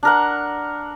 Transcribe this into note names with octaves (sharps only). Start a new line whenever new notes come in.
D4 A#4 F#5